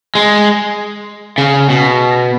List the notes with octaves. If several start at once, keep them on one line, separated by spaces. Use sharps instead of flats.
G#3
C#3
B2